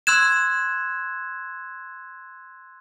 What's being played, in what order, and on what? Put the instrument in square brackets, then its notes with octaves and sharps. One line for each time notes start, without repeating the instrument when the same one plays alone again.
[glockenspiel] C6 E6 F#6 G#6 E7